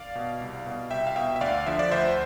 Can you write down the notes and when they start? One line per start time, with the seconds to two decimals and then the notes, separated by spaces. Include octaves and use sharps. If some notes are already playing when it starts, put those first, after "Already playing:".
Already playing: D5 F5
0.15 B2
0.41 C2
0.66 B2
0.90 C2 E5 G5
1.07 F5
1.16 B2 E5 G5
1.36 E5
1.41 D2 D5 F5
1.66 D3 F3 E5
1.79 D5
1.92 D2 C5 E5